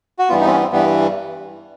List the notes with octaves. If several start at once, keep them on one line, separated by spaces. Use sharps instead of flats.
F#4
G2 E3 G3 B3 F4
D#4
C4
C#4
C4
G2 E3 G3 B3